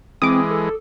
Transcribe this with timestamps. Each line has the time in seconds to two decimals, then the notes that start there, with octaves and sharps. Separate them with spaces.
0.22 E3 G#3 C4 D6 D#6
0.51 A4